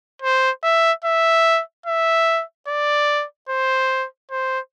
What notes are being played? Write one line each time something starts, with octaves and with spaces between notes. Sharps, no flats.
C5
E5
E5
E5
D5
C5
C5